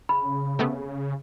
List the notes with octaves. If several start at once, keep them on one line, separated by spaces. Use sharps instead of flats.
C#3 B5
C3 A3 B3